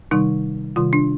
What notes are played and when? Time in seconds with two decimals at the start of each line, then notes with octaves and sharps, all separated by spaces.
0.11 C3 D#3 G3 D#4
0.76 C3 D#3 G3 F4
0.93 D4